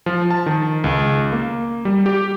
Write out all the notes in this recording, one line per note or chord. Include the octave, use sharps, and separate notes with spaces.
F3
A5
D#3
C#2
A#3
G3
G4